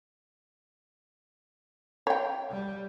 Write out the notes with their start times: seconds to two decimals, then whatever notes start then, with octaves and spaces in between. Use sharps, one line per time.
2.07 C#5 G5
2.51 G3